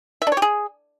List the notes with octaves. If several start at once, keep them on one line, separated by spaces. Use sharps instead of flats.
E5
D4
C#5
G4
G#4